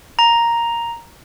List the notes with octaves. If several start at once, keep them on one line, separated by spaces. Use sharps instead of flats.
A#5